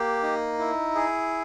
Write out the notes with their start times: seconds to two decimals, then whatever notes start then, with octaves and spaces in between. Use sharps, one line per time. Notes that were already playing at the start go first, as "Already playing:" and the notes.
Already playing: A#3 G4
0.23 D#4
0.59 E4
0.95 G#4